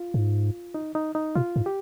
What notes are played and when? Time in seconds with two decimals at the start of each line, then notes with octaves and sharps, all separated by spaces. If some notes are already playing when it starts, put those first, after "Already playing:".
Already playing: F4
0.14 G#2
0.74 D#4
0.95 D#4
1.15 D#4
1.35 B2 F4
1.56 G#2
1.66 G4